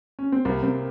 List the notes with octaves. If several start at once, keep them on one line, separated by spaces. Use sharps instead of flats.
C#4
C4
C2 A#3
C2 C4